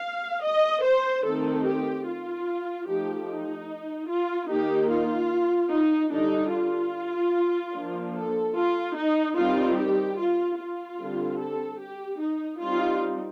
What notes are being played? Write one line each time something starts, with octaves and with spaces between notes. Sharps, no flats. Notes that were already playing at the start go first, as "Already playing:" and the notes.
Already playing: F5
D#5
C5
D#3 A3 C4 D#4 A4
G4
F4
F3 A3 D#4 G4
D#4
F4
D#3 A#3 D#4 G4
F4
D#4
D3 G3 D4 D#4
F4
F3 A#3 D4
A4
F4
D#4
D#3 G3 C4 D#4 F4
G4
F4
F4
D3 G3 C4
A4
G4
D#4
G3 C4 D#4 F4